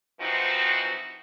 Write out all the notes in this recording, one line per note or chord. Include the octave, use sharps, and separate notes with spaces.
C3 E3 F3 C4 D#4 F#4